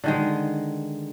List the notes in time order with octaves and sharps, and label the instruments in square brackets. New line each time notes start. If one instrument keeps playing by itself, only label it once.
[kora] D3 D#3 G#3